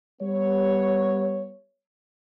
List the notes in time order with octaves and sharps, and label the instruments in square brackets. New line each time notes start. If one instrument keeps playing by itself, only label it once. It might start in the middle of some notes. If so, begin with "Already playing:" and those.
[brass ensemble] G3 B3 C#5